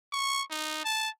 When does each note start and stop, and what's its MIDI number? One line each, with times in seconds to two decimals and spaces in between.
0.13 0.43 85
0.51 0.84 63
0.84 1.09 81